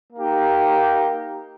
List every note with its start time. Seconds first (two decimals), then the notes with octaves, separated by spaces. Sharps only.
0.13 A#3 D#4 G4